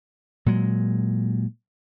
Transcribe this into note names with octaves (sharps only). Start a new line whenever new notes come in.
A#2 F#3 G#3